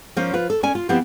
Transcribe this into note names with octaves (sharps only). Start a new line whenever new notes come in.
F3 A#3 C#4 C5
F3 F4 B4
A4
C#4 D5 G#5
F4
F3 B3 C4 E4 G4